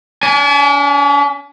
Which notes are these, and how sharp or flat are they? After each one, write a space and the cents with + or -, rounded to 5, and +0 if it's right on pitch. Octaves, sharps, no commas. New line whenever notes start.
D4 -45 G#5 +0